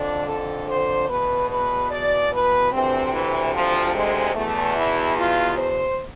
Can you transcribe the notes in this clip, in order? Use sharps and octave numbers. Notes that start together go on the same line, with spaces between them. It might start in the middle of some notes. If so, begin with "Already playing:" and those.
Already playing: F2 D3 D4
A4
C5
E2 B2 B4
B4
D5
B4
D2 C3 E3 C4
E3
F3
G#3
E2 B2 A3
E4
F4
C5